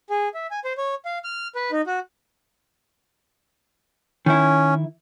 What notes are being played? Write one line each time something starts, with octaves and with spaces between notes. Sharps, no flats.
G#4
E5
G#5
C5
C#5
F5
F6
B4
D#4
F#4
D#3 C#4 E4